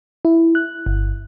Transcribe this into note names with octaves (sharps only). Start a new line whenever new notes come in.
E4
F#6
G1